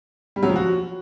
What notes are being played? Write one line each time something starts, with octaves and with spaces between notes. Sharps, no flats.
G3
F#3
F3
F#4